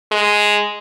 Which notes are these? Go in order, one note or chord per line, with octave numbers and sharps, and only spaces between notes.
G#3